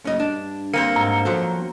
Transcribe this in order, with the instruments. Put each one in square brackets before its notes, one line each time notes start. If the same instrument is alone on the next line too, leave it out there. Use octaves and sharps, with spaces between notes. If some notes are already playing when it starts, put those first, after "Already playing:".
[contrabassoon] F#1 [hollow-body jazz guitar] C#4 D#5
[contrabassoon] G2 [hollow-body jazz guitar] D4
[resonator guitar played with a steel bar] A#3 C4 C5 [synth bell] C#7
[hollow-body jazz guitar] G#2 [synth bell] A#5
[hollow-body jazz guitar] F3 F#3 A4
[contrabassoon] G1